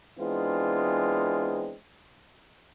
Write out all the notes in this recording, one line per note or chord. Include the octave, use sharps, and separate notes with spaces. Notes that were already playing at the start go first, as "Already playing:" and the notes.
E3 G#3 B3 C4 D4 F4